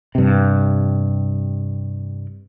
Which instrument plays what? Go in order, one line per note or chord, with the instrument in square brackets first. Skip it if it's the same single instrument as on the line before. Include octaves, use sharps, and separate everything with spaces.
[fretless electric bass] G2 C3